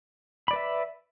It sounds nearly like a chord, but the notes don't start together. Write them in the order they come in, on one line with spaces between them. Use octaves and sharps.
B5 D5 B4 E5